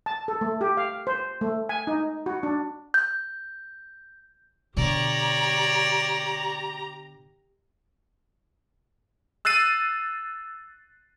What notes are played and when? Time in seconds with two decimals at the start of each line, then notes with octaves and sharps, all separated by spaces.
0.06 A5
0.28 A4
0.41 A3
0.61 G4
0.77 F5
1.07 C5
1.41 A3
1.69 G#5
1.87 D#4
2.26 F#4
2.43 D4
2.94 G6
4.77 B2 D3 G4 C#5 D5 A#5
9.45 E6 F#6 A6 C7 D#7